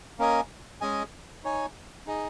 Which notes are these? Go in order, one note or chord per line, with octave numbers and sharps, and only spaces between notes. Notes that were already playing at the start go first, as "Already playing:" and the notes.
A#3 C#4 A#4 D#5 G#5
G#3 C#4 G#4 D#5 G#5
D#4 C#5 G#5
D#4 G#4 D#5